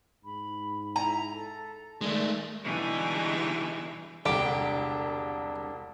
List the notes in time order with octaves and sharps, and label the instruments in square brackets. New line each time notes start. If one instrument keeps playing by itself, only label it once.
[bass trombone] G#2 [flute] B5
[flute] E4 [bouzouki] A#5
[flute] A4
[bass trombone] D#3 [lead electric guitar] G#3 A3 [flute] D5
[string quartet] B2 D3 E3 G3 G#3 D#4
[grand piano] E1 C2 [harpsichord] D3 [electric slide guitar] D4 [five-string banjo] G4